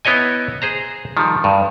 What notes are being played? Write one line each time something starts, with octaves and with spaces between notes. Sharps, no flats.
B3 E4 C#5 D#5 G#5
G#4 C5 A#5
D#3 F3 G3
G2